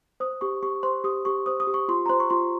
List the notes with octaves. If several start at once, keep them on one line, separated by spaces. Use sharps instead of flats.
C5 D#6
G4 C#6
G4 C#6
C5 C6
G4 D#6
G4 C#6
C5 D#6
D#6
G4
C#6
F4 C6
A#5
C5 C6
C#6
F4 C6